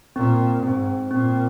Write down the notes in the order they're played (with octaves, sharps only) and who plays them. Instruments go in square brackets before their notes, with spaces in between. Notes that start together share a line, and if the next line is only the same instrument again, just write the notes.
[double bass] A#2 [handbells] C4
[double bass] G#2 [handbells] C4
[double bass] A#2 [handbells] C4